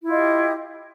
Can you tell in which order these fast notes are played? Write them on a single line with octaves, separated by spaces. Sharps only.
E4 F4 D#5 G4